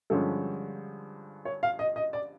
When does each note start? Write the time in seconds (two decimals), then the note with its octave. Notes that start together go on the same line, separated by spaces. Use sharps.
0.10 G2 D3 F3 G#3 C#4 A4
1.45 C#5
1.63 F5
1.79 D#5
1.96 D#5
2.13 D5